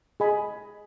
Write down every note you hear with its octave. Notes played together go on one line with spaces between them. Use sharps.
G#4 D#5 G#5 B5